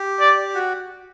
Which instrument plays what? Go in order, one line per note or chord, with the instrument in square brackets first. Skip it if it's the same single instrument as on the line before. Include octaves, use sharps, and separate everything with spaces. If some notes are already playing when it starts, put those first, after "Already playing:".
Already playing: [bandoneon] G4
[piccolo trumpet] D5
[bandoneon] F#4